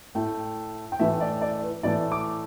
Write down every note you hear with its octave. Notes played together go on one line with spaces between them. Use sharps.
A2 A3 G5
G5
A2 E3 A3 E5
D5
D5
B4
A2 E3 A3 D5
D6